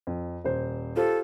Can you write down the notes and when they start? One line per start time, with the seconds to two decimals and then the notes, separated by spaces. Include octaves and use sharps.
0.07 F2
0.44 D#1 C5
0.96 F4 G4 A4 C5